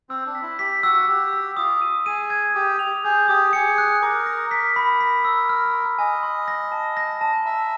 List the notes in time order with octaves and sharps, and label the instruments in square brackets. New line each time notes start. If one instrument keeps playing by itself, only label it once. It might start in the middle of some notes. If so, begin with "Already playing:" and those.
[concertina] C4 [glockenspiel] E6
[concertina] D4
[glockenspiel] B6
[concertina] E4
[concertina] G4 [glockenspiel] B6
[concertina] F#4 [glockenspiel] E6
[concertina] G4 [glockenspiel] E6
[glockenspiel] E6
[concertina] F4 [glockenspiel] D#6
[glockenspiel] D#7
[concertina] G#4 [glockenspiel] D#7
[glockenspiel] G#6
[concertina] G4 [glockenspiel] D#6
[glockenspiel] F7
[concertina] G#4 [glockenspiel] G6
[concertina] G4 [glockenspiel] D#6
[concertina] G#4 [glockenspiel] C#7
[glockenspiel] F#6
[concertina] A#4 [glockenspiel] D6
[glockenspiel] A#6
[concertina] A#4 [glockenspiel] B6
[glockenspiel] B5
B6
E6
F6
C6
[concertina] D#5 [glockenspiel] G#5
[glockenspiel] C6
A#6
A5
A#6
A5
[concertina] E5 [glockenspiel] A#5